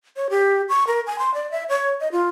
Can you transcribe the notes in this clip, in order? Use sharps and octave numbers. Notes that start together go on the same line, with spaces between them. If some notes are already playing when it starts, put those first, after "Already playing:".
C#5
G4
C#6
A#4
G#5
C6
D5
E5
C#5
D#5
F4